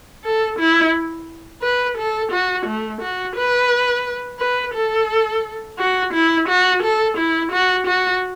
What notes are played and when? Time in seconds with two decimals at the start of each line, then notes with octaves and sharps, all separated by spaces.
0.24 A4
0.59 E4
1.62 B4
1.98 A4
2.31 F#4
2.66 A3
3.01 F#4
3.36 B4
4.39 B4
4.74 A4
5.79 F#4
6.13 E4
6.48 F#4
6.83 A4
7.18 E4
7.52 F#4
7.87 F#4